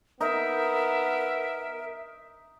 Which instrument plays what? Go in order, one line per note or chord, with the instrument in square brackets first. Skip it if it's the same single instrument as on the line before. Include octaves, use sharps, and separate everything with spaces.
[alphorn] B3 [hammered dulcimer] D#4 [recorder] A#4 [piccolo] E5